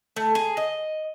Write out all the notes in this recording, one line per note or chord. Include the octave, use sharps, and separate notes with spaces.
A3
G#4
D#5